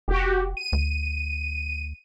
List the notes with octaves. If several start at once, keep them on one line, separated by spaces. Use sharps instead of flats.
F1 F#4 G4
D#7
D2